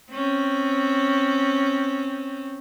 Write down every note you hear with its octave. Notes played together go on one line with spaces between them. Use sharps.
C4 C#4